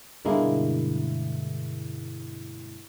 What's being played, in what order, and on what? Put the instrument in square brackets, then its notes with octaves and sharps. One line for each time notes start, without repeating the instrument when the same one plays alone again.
[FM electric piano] G2 B2 D3 G#3 A#3 E4